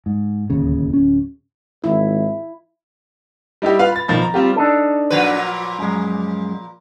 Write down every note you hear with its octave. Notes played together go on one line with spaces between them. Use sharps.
G#2
D1 D#2 C#3
D1 C#4
G#1 E4
G3 D#4 E4 G4
F4 B4 F5
B5 A6
B1 D#3 F3 B5 A6
A#5
G3 C4 F4 G4
D4 D#4 A4
A#2 F3 B4
F#2 G#3